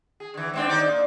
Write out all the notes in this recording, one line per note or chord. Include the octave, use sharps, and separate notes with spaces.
G#4
D3 E3
G#2 C4 D4
D#2 D#4 D5
A#2 A#3